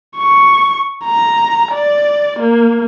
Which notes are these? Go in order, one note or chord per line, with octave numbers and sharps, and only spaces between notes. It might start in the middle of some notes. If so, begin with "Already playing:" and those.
C#6
A#5
D5
A#3